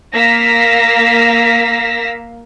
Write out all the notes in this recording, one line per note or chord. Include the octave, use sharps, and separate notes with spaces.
A#3 F5 E6 A#6 B6